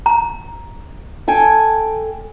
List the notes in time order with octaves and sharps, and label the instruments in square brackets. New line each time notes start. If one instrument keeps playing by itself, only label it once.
[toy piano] A#5
[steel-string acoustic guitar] A4 G5 G#5